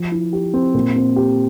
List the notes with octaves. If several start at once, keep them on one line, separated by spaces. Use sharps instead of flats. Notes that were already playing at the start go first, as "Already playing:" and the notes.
Already playing: F3
E4
G4
C4
A#2
C4
G4